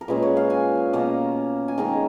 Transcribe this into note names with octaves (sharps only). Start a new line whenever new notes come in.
A#4
A#2 G#3 C#4 B4
C#5
F5
G#5
B2 A#3 C#4 A#5
G#5
D#3 G#3 C#4 A#5